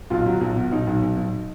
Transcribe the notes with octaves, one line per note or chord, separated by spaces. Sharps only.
B1 F4
F#3
B1
B2
B1 D#4
B1
B1
B1